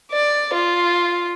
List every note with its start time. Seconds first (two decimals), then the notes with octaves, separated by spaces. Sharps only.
0.12 D5
0.54 F4